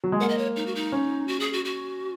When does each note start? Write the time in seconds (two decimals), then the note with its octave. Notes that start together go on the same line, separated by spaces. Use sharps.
0.04 F#3
0.12 G#3
0.21 A#3 F#5
0.29 D#5
0.38 C#5
0.56 D#4
0.66 F#4
0.75 D#4
0.92 C#4
1.28 F#4
1.40 G#4
1.53 F#4
1.65 F#4